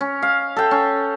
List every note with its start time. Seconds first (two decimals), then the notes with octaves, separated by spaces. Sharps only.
0.01 C#4
0.22 F5
0.56 A4 G5
0.71 C#4